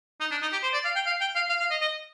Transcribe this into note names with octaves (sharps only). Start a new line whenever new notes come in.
D#4
D4
D#4
G4
C5
D5
F5
G5
F5
G5
F5
F5
F5
D#5
D#5